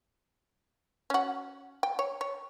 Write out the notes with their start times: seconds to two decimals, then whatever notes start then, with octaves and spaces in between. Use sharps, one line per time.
1.10 C#4 F#4
1.83 G5
1.99 C#5
2.21 C#5